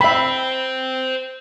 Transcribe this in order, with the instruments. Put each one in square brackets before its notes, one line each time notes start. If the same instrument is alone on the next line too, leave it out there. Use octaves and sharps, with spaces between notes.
[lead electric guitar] C5 G5 [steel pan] E5 B5